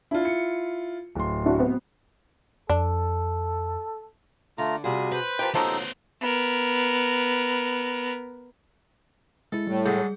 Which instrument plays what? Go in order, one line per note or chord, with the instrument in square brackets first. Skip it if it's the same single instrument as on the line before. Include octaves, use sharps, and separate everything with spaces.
[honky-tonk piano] D4 [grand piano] E4 F4
[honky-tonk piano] C#7
[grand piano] D1 C6
[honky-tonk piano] D4 E4 F#4
B3 C4
[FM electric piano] F2 [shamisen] D4 [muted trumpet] A4
[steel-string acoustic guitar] D3 [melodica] A3 F4 A#5
[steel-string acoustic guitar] C3 F#4 G#4 [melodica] G3 F4
[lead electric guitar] B4 [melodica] C5
[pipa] F3 A#4 G5 [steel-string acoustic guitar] G4
[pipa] F3 F#3 A#3 [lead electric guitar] B3 C5 [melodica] D#4 A4
[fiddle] B3 A#4
[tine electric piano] G#3 E4 [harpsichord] A4
[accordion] A2 [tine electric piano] G3
[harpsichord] F#3 G#3 A4 [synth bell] G#4